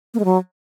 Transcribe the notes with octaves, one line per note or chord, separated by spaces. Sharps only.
A#3
G#3
F#3